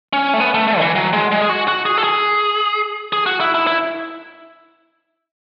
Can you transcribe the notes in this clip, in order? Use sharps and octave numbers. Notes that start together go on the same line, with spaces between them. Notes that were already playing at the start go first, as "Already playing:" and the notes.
C#4
A3
B3
A3
A3
D#3
E3
F#3
G#3
G#3
G#4
F#4
F#4
G#4
A4
G#4
G#4
F#4
E4
E4
E4